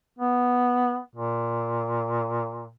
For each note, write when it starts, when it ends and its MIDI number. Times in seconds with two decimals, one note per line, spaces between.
0.19 0.98 59
1.16 2.73 46